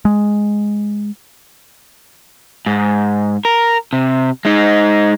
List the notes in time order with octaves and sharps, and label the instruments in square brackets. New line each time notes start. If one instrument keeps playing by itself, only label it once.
[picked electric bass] G#3
[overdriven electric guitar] G#2
A#4
C3
G#3 D#4